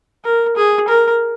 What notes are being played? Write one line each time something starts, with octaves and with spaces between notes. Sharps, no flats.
A#4
G#4
A#4